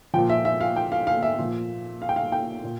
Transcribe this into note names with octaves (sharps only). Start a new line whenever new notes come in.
A#2 F3 G5
E5
E5
F5
G5
F5
F5
E5
A#2 F3
F5
G5
F5
G5
A#2